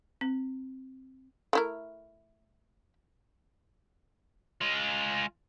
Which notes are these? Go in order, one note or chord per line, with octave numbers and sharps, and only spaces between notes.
C4
A3 E4 A#4
G#3 F4